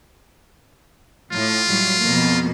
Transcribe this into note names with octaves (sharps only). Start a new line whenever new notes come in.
A2 F4
A2 F#3 G3
F2 B2 A#3